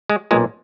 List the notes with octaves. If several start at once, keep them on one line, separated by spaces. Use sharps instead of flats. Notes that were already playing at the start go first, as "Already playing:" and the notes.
G#3
B1 A#2 G#3